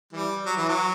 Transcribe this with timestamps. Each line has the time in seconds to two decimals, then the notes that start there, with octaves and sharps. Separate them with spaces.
0.13 E3 G3
0.46 F#3
0.57 E3
0.68 F#3